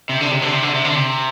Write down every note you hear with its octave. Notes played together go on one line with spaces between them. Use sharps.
C3
D3
C3
D3
C3
D3
C3
D3
C3